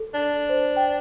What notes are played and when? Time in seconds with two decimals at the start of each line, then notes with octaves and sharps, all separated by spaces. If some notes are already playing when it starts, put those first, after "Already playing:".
Already playing: A4
0.14 D4
0.49 C5
0.76 G5